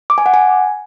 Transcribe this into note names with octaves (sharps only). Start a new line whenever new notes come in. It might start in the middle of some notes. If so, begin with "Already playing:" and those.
D6
G#5
F#5
G#5